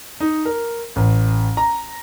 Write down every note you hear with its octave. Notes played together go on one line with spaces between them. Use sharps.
D#4
A#4
A1
A#5